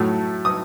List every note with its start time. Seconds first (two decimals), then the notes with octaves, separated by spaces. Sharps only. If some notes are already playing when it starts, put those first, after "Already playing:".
Already playing: A2 F#3 A3 E6
0.45 D#6